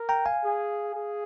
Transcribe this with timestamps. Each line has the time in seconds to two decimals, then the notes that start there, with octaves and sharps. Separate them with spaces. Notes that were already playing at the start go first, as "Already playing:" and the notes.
Already playing: A#4
0.09 G5 A#5
0.26 F5 G#5
0.44 G#4
0.95 G#4